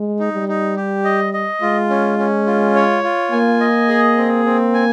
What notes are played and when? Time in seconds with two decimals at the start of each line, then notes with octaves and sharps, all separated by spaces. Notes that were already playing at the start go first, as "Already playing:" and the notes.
Already playing: G#3
0.20 D#4
0.33 G3
0.48 D#4
0.76 G4
1.04 D#5
1.33 D#5
1.61 G#3 F4
1.90 C#4
2.18 C#4
2.47 F4
2.75 C#5
3.03 F4
3.32 A#3 G#5
3.60 D#5
3.89 G#4
4.17 C4
4.45 C4
4.74 G#5